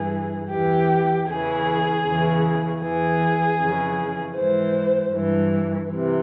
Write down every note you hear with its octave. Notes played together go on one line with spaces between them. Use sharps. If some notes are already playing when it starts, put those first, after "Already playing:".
Already playing: G2 E3 G#4
E2 E3 G4
E2 C#3 E3 G#4
E2 C#3 E3
E2 E3 G#4
F2 C#3 E3
G#2 E3 C5
G2 E3
C3 E3